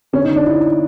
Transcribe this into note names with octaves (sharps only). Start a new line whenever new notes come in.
D3 C#4
D#4
D3
D4
D3 E4